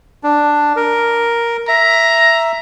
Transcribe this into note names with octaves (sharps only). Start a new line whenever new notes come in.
D4
A#4
E5 A#5